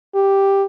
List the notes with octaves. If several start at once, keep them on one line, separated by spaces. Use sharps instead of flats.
G4